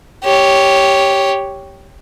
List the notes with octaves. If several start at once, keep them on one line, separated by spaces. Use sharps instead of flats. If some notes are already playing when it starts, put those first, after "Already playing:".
G4 C#5